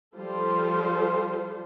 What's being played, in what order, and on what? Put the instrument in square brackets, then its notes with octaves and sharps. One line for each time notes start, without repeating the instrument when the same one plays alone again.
[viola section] F3 G3 F4 A4 C5